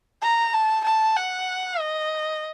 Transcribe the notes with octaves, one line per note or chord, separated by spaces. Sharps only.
A#5
A5
A5
F#5
D#5